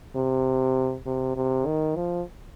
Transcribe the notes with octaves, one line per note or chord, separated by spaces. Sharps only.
C3
C3
C3
D#3
F3